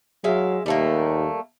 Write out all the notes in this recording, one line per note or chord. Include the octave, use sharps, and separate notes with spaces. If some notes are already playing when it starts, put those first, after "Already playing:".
F#3 G#3 E5 F5
D#2 G3 A3 A#3